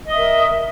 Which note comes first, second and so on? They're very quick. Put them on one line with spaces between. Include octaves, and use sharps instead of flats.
D#5 D#6 E5 A#4